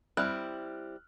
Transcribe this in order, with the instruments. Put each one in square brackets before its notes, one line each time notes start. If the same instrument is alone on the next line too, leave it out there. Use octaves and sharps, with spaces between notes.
[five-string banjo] G3 C4 E4 [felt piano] F6 F#6